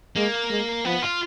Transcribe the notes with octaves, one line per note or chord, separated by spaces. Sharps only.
G#3 A#3
G#3
F3 B3
F4